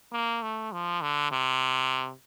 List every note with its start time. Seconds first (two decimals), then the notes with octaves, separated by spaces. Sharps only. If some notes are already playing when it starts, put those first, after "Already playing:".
0.13 A#3
0.43 A3
0.72 F3
1.02 D3
1.32 C3